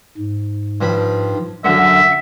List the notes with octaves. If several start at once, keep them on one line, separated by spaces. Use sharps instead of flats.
G#2
G2 F3 B5
F#2 D3 E5 F#5